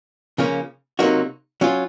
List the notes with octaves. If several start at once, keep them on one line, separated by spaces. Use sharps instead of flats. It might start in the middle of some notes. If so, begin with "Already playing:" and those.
C#3 F3 A#3 C#4
C3 F#3 A#3 D#4 F#4
F#3 C#4 F4